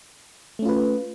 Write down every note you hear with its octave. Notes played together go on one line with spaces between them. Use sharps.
A3 C#4 F4 B4